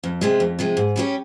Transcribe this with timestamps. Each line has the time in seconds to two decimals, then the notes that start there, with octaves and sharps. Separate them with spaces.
0.04 F2
0.21 C3 F3 G#3
0.40 F2
0.59 C3 F3 G#3
0.77 G#2
0.96 G3 C#4 G4 C#5